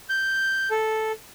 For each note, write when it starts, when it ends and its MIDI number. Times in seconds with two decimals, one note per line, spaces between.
0.09 0.69 91
0.71 1.12 69